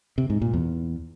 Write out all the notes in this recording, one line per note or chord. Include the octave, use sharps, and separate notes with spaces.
C3
G#2
A#2
E2